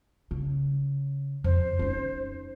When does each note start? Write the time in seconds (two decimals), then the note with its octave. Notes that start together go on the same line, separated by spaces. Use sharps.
0.31 C#3
1.44 F2 C5
1.79 C#4 D#4